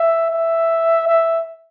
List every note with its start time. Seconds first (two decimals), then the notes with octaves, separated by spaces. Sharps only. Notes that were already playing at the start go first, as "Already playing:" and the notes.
Already playing: E5
0.30 E5
1.07 E5